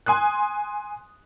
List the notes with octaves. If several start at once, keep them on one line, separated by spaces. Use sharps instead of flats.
G#5 C6 D#6 F#6